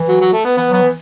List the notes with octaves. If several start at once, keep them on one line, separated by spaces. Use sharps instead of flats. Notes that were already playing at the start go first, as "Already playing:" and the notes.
Already playing: E3
F#3
F#3
A3
B3
E3 B3
F#3 B3
E3